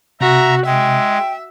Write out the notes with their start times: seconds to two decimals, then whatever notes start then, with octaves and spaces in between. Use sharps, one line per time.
0.21 C3 F#4 E5 A#5
0.66 G#3 E5 G5